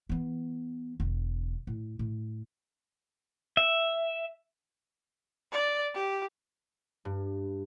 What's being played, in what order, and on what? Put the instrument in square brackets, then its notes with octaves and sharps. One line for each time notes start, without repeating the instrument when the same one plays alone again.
[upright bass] E3 B3
E1 D3
A2
A2
[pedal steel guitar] E5
[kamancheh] D5
G4
[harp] G2